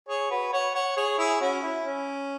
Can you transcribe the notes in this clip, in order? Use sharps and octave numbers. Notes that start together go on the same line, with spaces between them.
G#4 C#5
F#4 B4
C#5 F#5
C#5 F#5
G#4 C#5
E4 G#4
C#4 F#4
E4
C#4